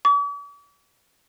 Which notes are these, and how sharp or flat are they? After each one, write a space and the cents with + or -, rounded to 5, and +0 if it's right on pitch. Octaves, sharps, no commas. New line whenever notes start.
D6 -45